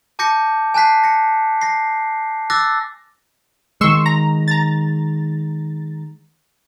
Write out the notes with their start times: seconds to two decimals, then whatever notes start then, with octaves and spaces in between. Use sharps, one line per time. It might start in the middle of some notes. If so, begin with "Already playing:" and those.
0.19 A5 D6 G6 A#6 C#7
0.74 G#5 A5 F#6 B6 C7
1.04 A#6 C#7
1.61 A#6 C7
2.50 D6 E6 F#6 A6 A#6
3.81 D#3 G#3 C6 C#6 E6
4.06 A#5
4.48 A#5 A6